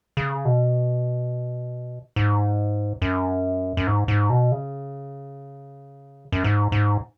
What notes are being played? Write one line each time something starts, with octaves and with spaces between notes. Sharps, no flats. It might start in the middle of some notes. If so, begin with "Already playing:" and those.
C#3
B2
G#2
F#2
F#2
G#2
G#2
B2
C#3
F#2
G#2
G#2